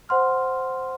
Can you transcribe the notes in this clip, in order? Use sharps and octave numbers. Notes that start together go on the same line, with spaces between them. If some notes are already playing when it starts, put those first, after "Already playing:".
C5 F#5 C6 F6